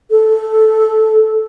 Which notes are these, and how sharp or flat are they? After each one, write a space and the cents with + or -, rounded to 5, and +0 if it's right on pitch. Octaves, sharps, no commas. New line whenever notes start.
A4 -10